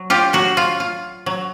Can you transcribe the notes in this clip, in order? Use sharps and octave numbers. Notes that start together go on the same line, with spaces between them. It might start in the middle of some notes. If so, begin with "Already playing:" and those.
Already playing: F#3
F4 G4
F#3 F#4
F4
F4
F#3